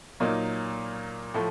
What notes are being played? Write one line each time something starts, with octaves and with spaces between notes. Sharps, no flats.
A#2 F#3 A#3 D#4
A2 F3 A3